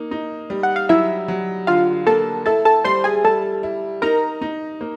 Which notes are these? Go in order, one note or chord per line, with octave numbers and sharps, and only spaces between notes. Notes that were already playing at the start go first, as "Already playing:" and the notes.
Already playing: A#3 D#4
D#4
G3
F#5
F5
F#3 E4 E5
F#3
D3 F4 F5
A#3 A4 A5
E4 A4 A5
A4 A5
G3 C5 C6
G#4 G#5
G3 A4 A5
E4
D#4 A#4 A#5
D#4
A#3